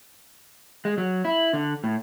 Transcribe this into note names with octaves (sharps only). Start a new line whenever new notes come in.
G#3
F#3
E4
D3
A2